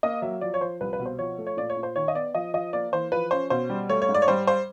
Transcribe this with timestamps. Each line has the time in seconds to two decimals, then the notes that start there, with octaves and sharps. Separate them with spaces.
0.03 A#3 D#5
0.22 F#3 E5
0.41 F3 D5
0.54 C#5
0.61 F3 C5
0.81 C2 B4
0.93 B4
0.99 B2
1.06 C5
1.19 F3 C#5
1.38 A3
1.47 C#5
1.57 A#2 D5
1.70 C#5
1.77 A#2
1.83 C5
1.96 D#3 C#5
2.08 D#5
2.15 B3 D5
2.34 F3 D#5
2.54 F3 D#5
2.73 A#3 D5
2.92 E3 C5
3.12 F3 B4
3.31 C#4 C5
3.50 B2 C5
3.70 G3
3.89 A3 C#5
4.02 C#5
4.09 G#2
4.14 D5
4.22 C#5
4.28 G3 C5
4.47 C5